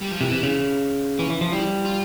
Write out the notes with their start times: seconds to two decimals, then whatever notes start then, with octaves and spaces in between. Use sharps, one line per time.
0.01 G3
0.11 F3
0.21 C3 E3
0.32 C3
0.43 C#3
1.19 E3 C#4
1.30 E3
1.41 F3
1.52 G3 E4
1.85 F4